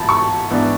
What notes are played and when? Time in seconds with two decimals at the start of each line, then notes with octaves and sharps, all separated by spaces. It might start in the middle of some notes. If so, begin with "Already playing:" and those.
Already playing: A1 G#2 E3 A5 B5
0.09 C#6
0.50 G#2 E3 B3 D4